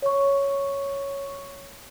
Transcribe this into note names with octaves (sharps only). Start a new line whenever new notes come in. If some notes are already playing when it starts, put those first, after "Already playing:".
C#5 C#6